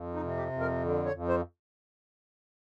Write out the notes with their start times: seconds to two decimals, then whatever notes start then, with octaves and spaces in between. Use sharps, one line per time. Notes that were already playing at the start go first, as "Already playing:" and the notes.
Already playing: F2
0.15 D#4
0.22 C3
0.37 G4
0.52 F2
0.60 A#4
0.83 D3
1.05 C#5
1.13 F2
1.29 C5